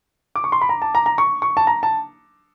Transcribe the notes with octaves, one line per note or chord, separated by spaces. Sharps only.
D6
C#6
C6
B5
A#5
A5
A#5
A#5
C#6
C#6
A5
A#5
A5